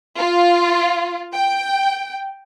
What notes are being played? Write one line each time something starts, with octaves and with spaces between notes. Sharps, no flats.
F4
G5